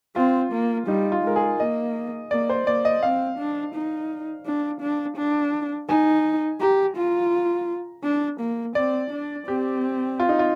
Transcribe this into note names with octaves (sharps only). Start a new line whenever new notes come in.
C4 F4
A#3
G3 D#4
F4
G#3 A#4
G#4
A#3 D#5
A#3 D5
C5
A#3 D5
D#5
C4 F5
D4
D#4
D4
D4
D4
D#4 G#5
G4 A#5
F4
D4
A#3
C4 D5
D4
C4 G4
F4
D#4
F4